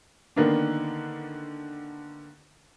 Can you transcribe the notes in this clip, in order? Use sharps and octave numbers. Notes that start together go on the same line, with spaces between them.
D3 D#3 A#3 B3 D4